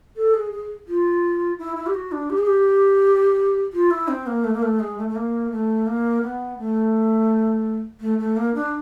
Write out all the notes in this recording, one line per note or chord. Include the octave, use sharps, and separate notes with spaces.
A4
G#4
G#4
F4
E4
E4
G4
F#4
D4
G4
G#4
G4
F4
E4
C4
A#3
A3
A#3
A3
G#3
A3
A3
A#3
A3
A#3
B3
A3
A3
A3
A#3
D4